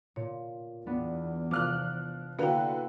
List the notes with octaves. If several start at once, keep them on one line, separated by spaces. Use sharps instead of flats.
A#2 C#5
E2 B3 D4
C3 F3 D6 F6 F#6
D3 A#3 E4 F#4 B4 F5 G5